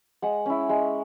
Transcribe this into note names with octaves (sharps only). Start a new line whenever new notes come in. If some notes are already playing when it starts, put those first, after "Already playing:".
G#3 F#5
C#4 E4
G#3